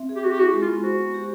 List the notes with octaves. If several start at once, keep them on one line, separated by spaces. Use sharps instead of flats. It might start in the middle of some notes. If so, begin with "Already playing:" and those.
Already playing: C4 E5
G#4
G4
F#4 G#4
G4
E4 F#4
G#3
F4
B3
F#4 C5
B3
G4